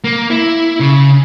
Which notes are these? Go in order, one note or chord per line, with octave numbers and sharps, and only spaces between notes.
A#3
E4
C#3